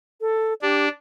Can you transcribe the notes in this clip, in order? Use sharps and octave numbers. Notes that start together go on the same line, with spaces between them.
A4
D4 G4